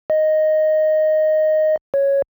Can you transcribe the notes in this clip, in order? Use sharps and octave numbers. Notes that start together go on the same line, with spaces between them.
D#5
C#5